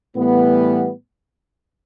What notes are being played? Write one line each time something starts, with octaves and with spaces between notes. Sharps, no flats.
A2 E3 G3 B3